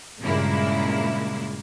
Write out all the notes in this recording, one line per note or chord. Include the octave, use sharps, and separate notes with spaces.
G2 A#2 C#3 G#3 A#3 E4